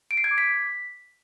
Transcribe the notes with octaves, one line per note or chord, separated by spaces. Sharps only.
D7
C7
G#6
D6
B6